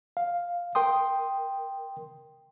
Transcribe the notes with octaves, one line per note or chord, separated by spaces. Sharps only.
F5
A#4 G5 C6 D#6